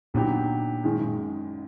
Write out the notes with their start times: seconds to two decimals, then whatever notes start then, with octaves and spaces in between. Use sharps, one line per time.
0.14 A#2 D3 F#3 B3 D#4 G4
0.83 G#1 F#2 D#3 G#3